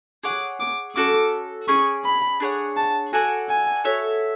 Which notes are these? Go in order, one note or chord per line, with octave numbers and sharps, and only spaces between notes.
G#4 C#5 F#5 D6
D6
C#4 F#4 A4 D6
C#4 G#4 D5 C#6
B5
D4 G#4 C#5 F#5
A5
F#4 A4 D5 F#5 G#5
G#5
F#4 A4 C#5 E5